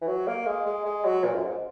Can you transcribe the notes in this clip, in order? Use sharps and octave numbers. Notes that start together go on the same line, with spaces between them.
E3
F#3
A#3
G#3
G#3
G#3
F#3
A#2
F#2
G#2